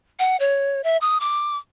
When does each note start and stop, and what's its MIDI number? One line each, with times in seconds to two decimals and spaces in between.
0.19 0.37 78
0.40 0.82 73
0.84 0.97 76
1.01 1.18 87
1.20 1.57 86